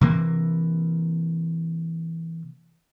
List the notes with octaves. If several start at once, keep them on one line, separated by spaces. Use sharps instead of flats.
C3 E3 A#3